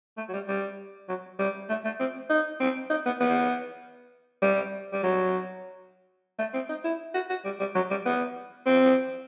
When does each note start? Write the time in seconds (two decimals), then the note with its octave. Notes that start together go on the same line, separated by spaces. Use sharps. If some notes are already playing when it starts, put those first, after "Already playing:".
0.17 A3
0.29 F#3
0.33 G3
0.48 G3
1.09 F#3
1.39 G3
1.69 A3
1.84 A3
2.00 C4
2.30 D#4
2.60 C4
2.90 D#4
3.06 B3
3.21 B3
4.42 G3
4.93 G3
5.03 F#3
6.39 A3
6.54 C4
6.69 D#4
6.84 E4
7.14 F#4
7.30 F#4
7.45 G3
7.60 G3
7.75 F#3
7.90 G3
8.06 B3
8.66 C4